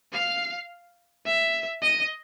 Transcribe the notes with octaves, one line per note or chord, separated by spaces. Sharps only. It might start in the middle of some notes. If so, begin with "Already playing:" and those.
F5
E5
D#5